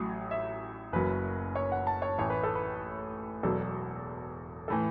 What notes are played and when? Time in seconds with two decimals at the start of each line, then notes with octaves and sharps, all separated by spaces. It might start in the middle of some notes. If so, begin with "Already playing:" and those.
Already playing: A1 A2 F#3
0.31 E5
0.92 F#1 F#2 F#3 B4
1.55 C#5
1.72 F#5
1.87 A5
2.02 C#5
2.18 A1 A2 E3 C#5
2.30 B4
2.43 A4
2.55 B4
3.43 E1 E2 B2 F#3 A4
4.68 A2 E3 A4